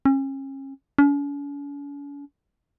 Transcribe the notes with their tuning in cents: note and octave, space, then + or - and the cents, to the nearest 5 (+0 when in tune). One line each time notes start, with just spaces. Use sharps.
C#4 -35
C#4 +45